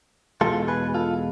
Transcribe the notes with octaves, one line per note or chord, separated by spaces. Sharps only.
E2 B2 G#3 F4 A4
G#4 B4
F4 A4